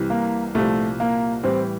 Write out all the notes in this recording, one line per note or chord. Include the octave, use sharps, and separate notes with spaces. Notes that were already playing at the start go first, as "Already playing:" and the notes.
Already playing: C2 C3 E3 G3
A#3
C2 A#2 F3 A3
A#3
A2 E3 G3 C4